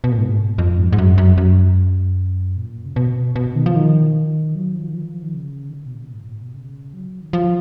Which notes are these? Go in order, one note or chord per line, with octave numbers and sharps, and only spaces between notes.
B2
A#2
G#2
F2
G#2
G#2
F#2
F#2
F#2
A#2
C#3
B2
B2
D#3
F3
D#3
F#3
F3
D#3
F3
D#3
C#3
D#3
C#3
B2
A#2
G#2
A#2
B2
C#3
F#3
D#3
F3